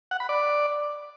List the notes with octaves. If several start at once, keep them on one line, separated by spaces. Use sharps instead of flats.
F#5
B5
D5